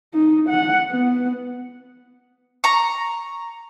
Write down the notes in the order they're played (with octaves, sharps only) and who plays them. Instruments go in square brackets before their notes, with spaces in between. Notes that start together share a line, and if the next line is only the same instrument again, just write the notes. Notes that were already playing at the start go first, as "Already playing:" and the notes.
[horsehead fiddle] D#4
F#5
B3
[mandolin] A#5 C#6